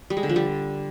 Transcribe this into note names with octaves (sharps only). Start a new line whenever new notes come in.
G3
G#3
D3
F3
G3